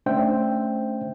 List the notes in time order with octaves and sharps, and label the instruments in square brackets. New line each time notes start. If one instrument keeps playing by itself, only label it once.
[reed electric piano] A3 C#4 D4 C5 E5 G5